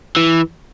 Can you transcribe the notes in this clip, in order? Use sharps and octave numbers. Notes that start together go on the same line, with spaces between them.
E3